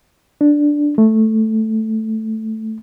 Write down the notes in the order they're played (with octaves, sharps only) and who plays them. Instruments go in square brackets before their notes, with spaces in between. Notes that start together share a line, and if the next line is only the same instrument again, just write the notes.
[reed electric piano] D4
A3